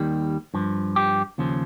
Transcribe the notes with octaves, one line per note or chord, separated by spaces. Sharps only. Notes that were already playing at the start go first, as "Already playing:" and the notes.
Already playing: D#2 D#3 G3
G2 F3
G4
D#2 C#3 F3